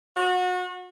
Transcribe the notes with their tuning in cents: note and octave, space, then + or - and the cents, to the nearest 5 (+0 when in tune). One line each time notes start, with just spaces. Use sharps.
F#4 -30